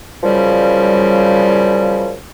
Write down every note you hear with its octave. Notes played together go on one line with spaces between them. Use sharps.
F#2 C#3 F3 G3